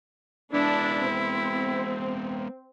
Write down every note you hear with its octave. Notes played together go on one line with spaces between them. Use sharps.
G#3 B3 D4 E4
C4